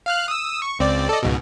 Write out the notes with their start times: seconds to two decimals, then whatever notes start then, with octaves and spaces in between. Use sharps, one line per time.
0.06 F5 F6 F#6
0.28 D#6 E6
0.62 C#6
0.79 C#2 C4 D5
1.09 A4 D5 D#5
1.23 C#2 G#2 B2